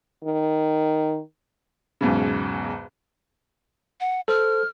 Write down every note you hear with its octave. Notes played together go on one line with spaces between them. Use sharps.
D#3
B1 E2 G#2 C#3
F#5
A4 C5 F6